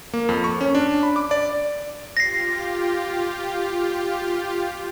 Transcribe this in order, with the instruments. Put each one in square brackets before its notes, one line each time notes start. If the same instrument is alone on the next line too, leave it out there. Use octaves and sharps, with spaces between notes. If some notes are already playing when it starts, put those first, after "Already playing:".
[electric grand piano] A#3
F2
C#6
C#4
D4
B5
D6
D5
[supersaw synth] F4 G4 [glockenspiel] A#6 C7